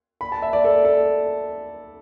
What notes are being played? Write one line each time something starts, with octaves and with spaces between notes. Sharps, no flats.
B5
A5
E5
D5
A4
A4